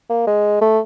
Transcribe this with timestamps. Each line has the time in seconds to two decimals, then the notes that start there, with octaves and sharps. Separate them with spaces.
0.10 A#3
0.27 G#3
0.61 A3